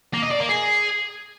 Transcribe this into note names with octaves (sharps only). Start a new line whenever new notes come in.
A#3
D#5
D5
A#3
G#4